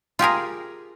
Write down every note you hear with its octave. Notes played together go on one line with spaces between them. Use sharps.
F4 G4 G#4 A#4